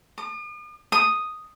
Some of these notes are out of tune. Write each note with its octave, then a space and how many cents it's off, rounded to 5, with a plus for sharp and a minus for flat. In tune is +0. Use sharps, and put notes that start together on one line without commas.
D#6 -45
D#6 +0